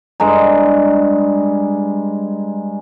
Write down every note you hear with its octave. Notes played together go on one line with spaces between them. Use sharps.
G2 G#3 A#5